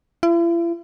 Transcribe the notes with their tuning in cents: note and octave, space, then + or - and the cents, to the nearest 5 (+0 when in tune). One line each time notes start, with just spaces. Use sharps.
E4 +45